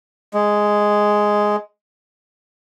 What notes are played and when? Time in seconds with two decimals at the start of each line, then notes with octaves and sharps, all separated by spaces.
0.34 G#3